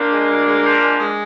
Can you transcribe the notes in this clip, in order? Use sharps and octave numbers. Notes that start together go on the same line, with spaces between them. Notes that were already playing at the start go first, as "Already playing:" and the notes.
Already playing: F3 A#3 D4
G#3
D2
G#3
F3
G#3
G#3